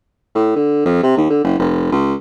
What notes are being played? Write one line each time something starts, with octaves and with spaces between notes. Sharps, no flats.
A2
D3
F2
C3
D#2
D3
F#1
F1
C#2